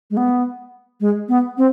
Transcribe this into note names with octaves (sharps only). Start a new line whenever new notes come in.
G#3
B3
G#3
B3
C4